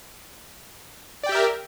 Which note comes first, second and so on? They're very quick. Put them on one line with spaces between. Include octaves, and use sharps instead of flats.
D5 G5 G4 E5 A#4